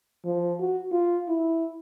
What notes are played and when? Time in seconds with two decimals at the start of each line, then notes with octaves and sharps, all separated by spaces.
0.25 F3
0.60 F#4
0.92 F4
1.29 E4